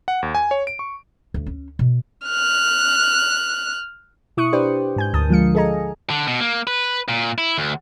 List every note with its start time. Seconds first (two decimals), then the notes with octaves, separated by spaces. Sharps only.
0.08 F#5
0.22 D#2
0.35 G#5
0.51 C#5
0.67 D7
0.79 C#6
1.34 D2
1.46 C#4
1.79 B2
2.27 F6 F#6
4.37 B2 E4 C#6 D#6 F#6 C#7
4.53 D4 G4 B4 C5 D5 G5
4.96 G#2 G#5 G6
5.14 D2 A#4 A5 D#6
5.29 D3 F3 G#3 F5 C#7
5.55 G#4 A4 D#5 G#5 A#5
6.10 D3
6.27 B2
6.40 A#3
6.67 B4
7.09 A#2
7.38 E4
7.58 D2